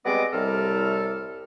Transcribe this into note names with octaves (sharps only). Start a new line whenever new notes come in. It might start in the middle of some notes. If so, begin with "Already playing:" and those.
G3 G#3 B3 C4 D#5 D6
C2 A2 C3 G3 A4 F6